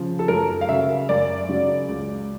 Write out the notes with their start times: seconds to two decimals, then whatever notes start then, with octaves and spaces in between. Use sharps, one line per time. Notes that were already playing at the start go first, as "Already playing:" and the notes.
Already playing: C#3 F3
0.19 A4
0.28 F#2 A#4
0.61 F5
0.69 C#3 F#3 E5
1.09 F#2 D5
1.49 C#3 F#3
1.88 C#2